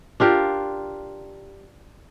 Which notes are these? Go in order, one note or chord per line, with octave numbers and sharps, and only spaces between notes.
D4 F4 G4 A#4